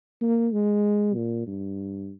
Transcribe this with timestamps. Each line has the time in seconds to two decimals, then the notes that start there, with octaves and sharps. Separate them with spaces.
0.22 A#3
0.52 G#3
1.15 A#2
1.47 G2